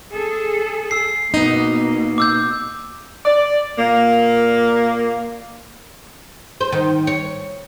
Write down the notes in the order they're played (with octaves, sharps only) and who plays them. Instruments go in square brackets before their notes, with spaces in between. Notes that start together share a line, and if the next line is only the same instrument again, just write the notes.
[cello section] G#4 A4
[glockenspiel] E6 C7
[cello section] B2 A#3 [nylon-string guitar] B3 D#4
[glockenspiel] D6 E6 G6
[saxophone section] D5
A#2 A#3
[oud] C5
D#3
C#5